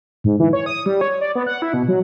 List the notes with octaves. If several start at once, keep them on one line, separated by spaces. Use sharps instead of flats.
G#2
E3
C#5
D#6
G3
C#5
D5
B3
F#5
E4
B2
F#3